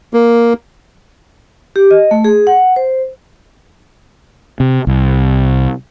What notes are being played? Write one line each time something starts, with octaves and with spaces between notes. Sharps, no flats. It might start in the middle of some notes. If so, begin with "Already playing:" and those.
A#3
G4
D#5
A3
G#4
F#5
C5
C3
C2